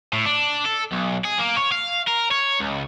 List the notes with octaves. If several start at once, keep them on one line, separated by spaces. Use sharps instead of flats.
A2
D4
A4
B1
G#4
A#3
C#5
F5
A#4
C#5
C#2